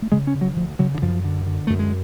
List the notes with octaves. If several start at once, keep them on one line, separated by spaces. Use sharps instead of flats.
A3
C#3 G#3
C#4
C#3
F#3
D2 F3
C#3 F#3
D3
F#2 F3
D3
D3
F#2 A3
G#3